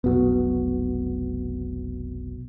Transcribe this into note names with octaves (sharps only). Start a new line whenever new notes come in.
F1 B1 B3 F#4